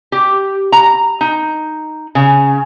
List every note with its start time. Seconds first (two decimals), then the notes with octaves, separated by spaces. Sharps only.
0.12 G4
0.72 A#5
1.21 D#4
2.15 C#3